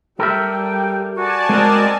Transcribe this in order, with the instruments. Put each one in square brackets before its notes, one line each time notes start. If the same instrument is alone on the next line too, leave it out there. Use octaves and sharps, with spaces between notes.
[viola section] G3 [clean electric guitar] A4 A#4 E5 [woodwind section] G5
[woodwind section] F#4 [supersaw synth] D5 G#5 A5
[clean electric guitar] G#3 [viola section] C4 A#4 D#5